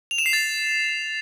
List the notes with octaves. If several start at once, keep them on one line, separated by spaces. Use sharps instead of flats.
F7
E7
C7
A6